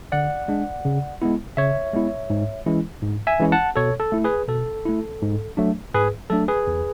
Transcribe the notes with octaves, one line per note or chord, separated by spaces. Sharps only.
D3 D5 F#5
G#3 D4
C#3
G#3 B3 E4
C#3 C#5 E5
G#3 B3 E4
G#2
E3 G#3 C#4 E4
G#2
E5 G#5
E3 G#3 C#4 E4
F#5 A5
B2 A4 C#5
A4
A3 E4
G#4 B4
B2 A4
A3 E4
G#2
F#3 A3 D4
G#2 G#4 B4
F#3 A3 D4 A4
G#4 B4
E2